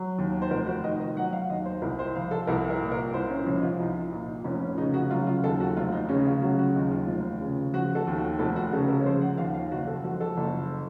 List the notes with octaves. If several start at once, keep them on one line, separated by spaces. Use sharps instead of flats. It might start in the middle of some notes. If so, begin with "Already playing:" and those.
Already playing: F#3
D#2
C5
F1 A#4
F#4
D#3 D#5
D#5
F#3 F#5
F5
D#2 D#5
C5
C2 A#4
C5
F3 F5
A4
C2 A#4
A#4
A#2
A#4
C2 C5
C#4
F3 C#4
D#4
F4
C2 D#4
A#2
D#4
F1 C#4
C#4
C#3 D#4
F#4
F#3 F4
F4
D#2 A4
F#4
F1 F4
D#4
C#3 C#4
F4
F#3 F#4
F#4
D#2 D#4
F4
F1
C#3
F3 F#4
A4
D#2
F#4
F1 A4
F#4
C#3 A4
A#4
C#5
F3 C5
F#5
D#2 F5
F5
F#1 F#4
A4
F3 F#4
A4
F#1